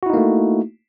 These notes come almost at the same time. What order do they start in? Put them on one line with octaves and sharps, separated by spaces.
F#4 E4 D#4 A#3 A3